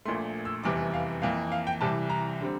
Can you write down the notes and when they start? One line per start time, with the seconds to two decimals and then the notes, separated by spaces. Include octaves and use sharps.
0.05 A#1 A#2 A3 C6
0.45 E6
0.64 F1 E2 C3 E3 G3 D6
0.94 F5
1.22 F2 E3 A#3 F5
1.52 F5
1.67 G5
1.81 C2 C3 E3 G3 A5
2.10 A#5
2.41 D3 G3 C4